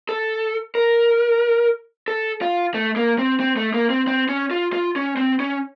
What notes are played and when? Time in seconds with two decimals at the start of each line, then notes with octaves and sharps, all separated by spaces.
0.09 A4
0.75 A#4
2.08 A4
2.42 F4
2.74 A3
2.96 A#3
3.19 C4
3.40 C4
3.57 A3
3.74 A#3
3.90 C4
4.07 C4
4.29 C#4
4.51 F4
4.73 F4
4.96 C#4
5.17 C4
5.40 C#4